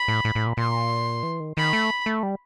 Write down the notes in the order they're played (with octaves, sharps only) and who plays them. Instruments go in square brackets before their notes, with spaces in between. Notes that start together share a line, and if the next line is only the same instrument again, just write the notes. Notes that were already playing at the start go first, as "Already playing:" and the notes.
Already playing: [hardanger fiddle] B5
[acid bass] A2
A2
A2
A#2
[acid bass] A#2 [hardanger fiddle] C6
[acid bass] E3
D#3
[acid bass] D#3 [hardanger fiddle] B5
[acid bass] A3
A3
G3